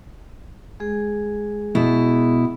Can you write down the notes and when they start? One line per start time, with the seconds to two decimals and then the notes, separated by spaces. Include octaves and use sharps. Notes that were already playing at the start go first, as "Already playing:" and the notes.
0.80 G#3 G#4
1.75 B2 E4